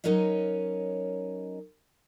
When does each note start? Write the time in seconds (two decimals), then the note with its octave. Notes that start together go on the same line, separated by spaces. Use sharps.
0.04 F#3 C#4 D#4 A#4 C#5 D#5